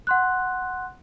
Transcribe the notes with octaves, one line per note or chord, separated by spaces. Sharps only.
F#5 C6 F#6